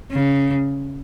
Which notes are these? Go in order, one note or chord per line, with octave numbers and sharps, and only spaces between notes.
C#3